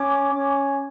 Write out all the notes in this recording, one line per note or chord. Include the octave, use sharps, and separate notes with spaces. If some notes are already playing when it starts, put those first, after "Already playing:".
Already playing: C#4 D6
C#4